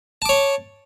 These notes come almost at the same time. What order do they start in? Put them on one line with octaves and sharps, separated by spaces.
A5 D6 C#5